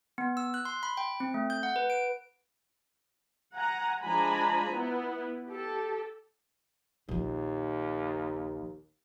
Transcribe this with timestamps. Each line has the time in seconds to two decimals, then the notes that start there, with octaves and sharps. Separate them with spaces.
0.18 B3
0.37 E6
0.54 F#6
0.65 C6
0.83 B5
0.97 G5
1.20 C4
1.34 A3
1.50 G6
1.63 F#5
1.76 B4
1.90 D7
3.55 F#5 G#5 A#5
4.04 F3 G#3 D4 G#5 A#5 B5
4.72 B3 E4
5.49 G4 A4
7.09 A#1 D#2 F3